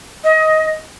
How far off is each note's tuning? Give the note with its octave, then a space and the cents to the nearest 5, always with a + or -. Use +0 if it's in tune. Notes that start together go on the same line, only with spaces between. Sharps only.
D#5 +20